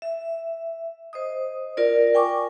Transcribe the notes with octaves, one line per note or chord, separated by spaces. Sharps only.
E5
C5 D#5 D#6
F4 A#4 D5
G5 G#5 C#6 D6